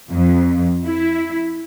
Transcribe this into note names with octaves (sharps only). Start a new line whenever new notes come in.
F2
E4